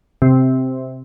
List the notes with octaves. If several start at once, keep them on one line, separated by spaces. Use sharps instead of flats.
C3